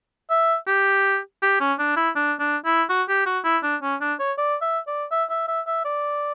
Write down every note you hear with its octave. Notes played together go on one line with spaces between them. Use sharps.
E5
G4
G4
C#4
D4
E4
D4
D4
E4
F#4
G4
F#4
E4
D4
C#4
D4
C#5
D5
E5
D5
E5
E5
E5
E5
D5